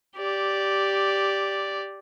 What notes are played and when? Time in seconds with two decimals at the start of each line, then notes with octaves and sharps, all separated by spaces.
0.17 G4 D5